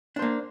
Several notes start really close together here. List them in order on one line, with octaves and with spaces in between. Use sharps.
D4 C5 A#3